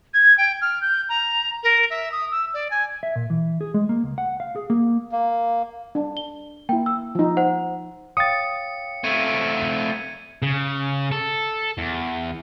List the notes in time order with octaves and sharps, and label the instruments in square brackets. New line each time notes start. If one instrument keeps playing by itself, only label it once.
[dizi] G#6
G5
F6
G6
A#5
A#4
E5
D#6
E6
D5
G#5
[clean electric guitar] E5
A#2
E3
G#4
G#3
A#3
C#2
F#5
F5
G#4
A#3
[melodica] A#3
[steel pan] D4
[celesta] G7
[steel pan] A#3 E4 [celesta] G5
[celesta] E6
[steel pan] F3 D#4
[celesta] C5 F#5
[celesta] C#5 F5 G5 [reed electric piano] D#6 A6 [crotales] C#7
[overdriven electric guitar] A3 C4 [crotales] G#6 D#7
[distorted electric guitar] C#3
A4
E2